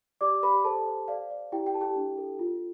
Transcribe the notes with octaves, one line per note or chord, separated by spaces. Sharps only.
G4 D5 D6
G4 B4 B5
A4 C5 A5
C5
D5 F5
D5
E4 G4 G5
G4 G5
A4 A5
G4 G5
D4
A4
F4